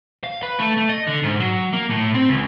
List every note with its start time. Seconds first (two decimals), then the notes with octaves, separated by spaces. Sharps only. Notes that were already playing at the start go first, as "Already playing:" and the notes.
0.24 F5
0.43 B4
0.59 A3
0.77 A3
0.89 D#5
1.07 D3
1.23 G#2
1.40 F#3
1.73 A#3
1.90 A2
2.14 C4
2.29 C#2